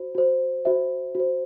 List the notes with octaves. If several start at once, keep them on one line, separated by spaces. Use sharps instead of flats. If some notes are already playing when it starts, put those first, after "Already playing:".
Already playing: F#4 C5
F#4 C5
F#4 C5 E5
F#4 C5